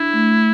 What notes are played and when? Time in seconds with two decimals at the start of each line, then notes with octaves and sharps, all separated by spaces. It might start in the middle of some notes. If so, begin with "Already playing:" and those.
Already playing: D4 E4
0.13 A3